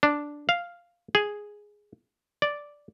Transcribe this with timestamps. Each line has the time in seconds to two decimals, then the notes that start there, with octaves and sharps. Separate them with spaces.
0.03 D4
0.49 F5
1.15 G#4
2.42 D5